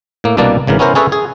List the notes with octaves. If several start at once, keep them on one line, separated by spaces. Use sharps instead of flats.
A2 A#3
C2 B2 G3 A#3 D4 A5
G#1 C#3 E3 A#4
B3 C#4 E4 A#4 C5
C#4 G#4 A4 B4 C#5 E5
G#4